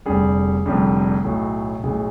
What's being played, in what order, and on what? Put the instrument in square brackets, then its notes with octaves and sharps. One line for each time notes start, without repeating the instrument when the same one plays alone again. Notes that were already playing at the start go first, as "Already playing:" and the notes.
[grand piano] F1 F2 D3 G3 G#4
F1 F2 D3 G3
B1 A2 F#3
B1 A2 F#3 G#4